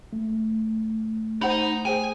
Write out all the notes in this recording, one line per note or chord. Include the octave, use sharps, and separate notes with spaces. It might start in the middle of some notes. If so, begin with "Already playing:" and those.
A3
D#4 C5 F#5 B5
G#4 C5 G5 G#5